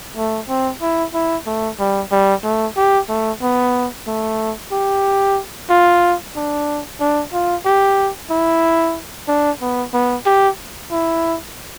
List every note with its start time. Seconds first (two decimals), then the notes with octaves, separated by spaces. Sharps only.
0.17 A3
0.49 C4
0.82 E4
1.14 E4
1.47 A3
1.80 G3
2.12 G3
2.44 A3
2.77 G4
3.09 A3
3.42 B3
4.07 A3
4.72 G4
5.70 F4
6.36 D4
7.00 D4
7.33 F4
7.66 G4
8.30 E4
9.28 D4
9.62 B3
9.93 B3
10.26 G4
10.91 E4